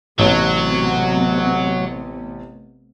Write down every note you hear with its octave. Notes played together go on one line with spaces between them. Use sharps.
A1 C3 F#3 A3 B3